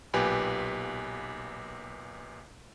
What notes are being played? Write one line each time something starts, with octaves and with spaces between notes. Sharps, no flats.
B1 A#2 G4 B4 G#5